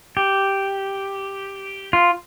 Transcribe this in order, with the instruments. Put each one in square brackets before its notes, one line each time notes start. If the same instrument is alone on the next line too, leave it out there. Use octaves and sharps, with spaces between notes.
[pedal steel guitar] G4
F4